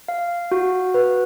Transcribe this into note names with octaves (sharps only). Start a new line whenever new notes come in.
F5
F#4
B4